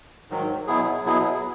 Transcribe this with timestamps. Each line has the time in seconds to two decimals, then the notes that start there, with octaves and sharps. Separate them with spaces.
0.30 G#2 D#3 F#3
0.67 B2 F#3 B3 E4 G#4
1.05 B2 F#3 B3 E4 G#4